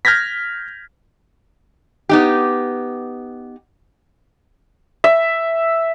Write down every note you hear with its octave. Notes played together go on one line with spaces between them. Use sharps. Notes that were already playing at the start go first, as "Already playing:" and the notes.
F6 G6 G#6 A#6 B6
B3 D#4 G4
E5